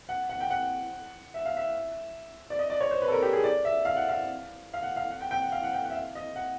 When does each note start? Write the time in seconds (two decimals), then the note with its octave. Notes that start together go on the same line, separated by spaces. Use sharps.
0.09 F#5
0.29 F#5
0.40 G5
0.50 F#5
1.34 E5
1.45 F5
1.57 E5
2.50 D5
2.59 D#5
2.70 D5
2.81 C#5
2.91 C5
3.02 B4
3.08 A4
3.12 A#4
3.22 G4
3.33 G#4
3.44 D5
3.65 E5
3.85 F5
3.96 F#5
4.09 F5
4.74 F5
4.83 F#5
4.96 F5
5.11 F#5
5.21 G5
5.31 G5
5.42 F#5
5.52 F5
5.63 F#5
5.73 G5
5.84 F#5
5.90 E5
5.94 F5
6.15 D#5
6.36 F#5